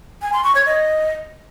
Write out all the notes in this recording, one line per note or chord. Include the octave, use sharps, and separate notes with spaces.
G#5
C6
C#6
C#5
D#5